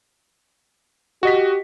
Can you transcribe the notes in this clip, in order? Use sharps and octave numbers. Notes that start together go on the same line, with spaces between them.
F#4 G4 D#5 B6